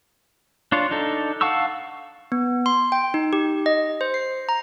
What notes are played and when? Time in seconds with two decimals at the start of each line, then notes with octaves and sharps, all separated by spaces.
0.72 D4 F4 C#5
0.91 D4 D#4 A4
1.41 F5 F#5 A5 C#6 E6
2.32 B3
2.66 C6
2.92 G5
3.14 D#4
3.33 G4
3.66 D#5
4.01 C5
4.14 C7
4.49 A#5